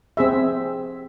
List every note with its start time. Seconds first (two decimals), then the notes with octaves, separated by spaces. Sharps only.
0.17 C4 G#4 E5